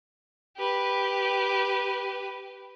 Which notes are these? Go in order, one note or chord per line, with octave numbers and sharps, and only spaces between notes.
G4 B4